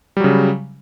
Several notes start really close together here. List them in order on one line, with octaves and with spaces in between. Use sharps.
G3 F#3 C#3